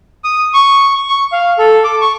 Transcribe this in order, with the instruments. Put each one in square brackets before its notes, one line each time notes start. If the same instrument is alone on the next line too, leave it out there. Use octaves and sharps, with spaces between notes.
[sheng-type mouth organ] D#6
C#6
C#6
F5
A4
D6
C#6